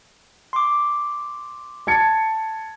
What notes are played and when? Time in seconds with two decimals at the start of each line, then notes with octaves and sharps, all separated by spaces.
0.53 C6 D6
1.87 A5 G#6 C#7